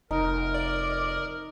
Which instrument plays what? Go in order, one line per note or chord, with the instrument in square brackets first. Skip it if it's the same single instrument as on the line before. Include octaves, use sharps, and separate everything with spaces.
[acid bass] F1 [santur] D#4 [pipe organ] A#4
[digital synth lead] D5